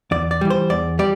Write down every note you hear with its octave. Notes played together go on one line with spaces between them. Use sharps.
E2 D5
D5
E3 G3
C5
E2 D5
G3 D5